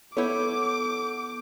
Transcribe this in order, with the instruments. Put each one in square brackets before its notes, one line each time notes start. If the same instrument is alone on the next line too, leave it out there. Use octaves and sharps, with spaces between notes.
[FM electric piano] B3 F#5 G6 [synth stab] E4 C#5 [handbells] A4 [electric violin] D6